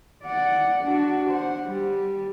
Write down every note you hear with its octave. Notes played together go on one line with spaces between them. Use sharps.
D5 F#5
D4 F#4
C5 F#5
G3